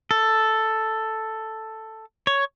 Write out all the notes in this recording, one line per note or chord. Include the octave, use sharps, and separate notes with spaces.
A4
C#5